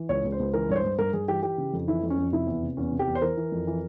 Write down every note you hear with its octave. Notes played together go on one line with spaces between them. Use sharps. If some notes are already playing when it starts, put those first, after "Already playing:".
Already playing: E3
C#2 C#5
C#2
C5
C#2
E3 A#4
G2 C#5
C5
G2
G2 A#4
G2 G#4
E3 G4
E3 G4
C#3
F2
E3 E4
F2
C#4
F2
C3 E4
E2
C3
E2 C#4
C3
G4
E2
C5
E3 A#4
E3
F2
E3